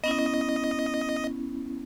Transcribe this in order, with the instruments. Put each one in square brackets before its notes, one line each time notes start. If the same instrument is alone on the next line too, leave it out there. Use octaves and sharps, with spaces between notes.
[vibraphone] B3 C#4 E4 [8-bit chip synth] D#5